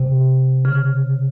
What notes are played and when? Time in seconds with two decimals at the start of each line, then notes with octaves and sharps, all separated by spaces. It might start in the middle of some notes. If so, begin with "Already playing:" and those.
Already playing: C3
0.65 C#3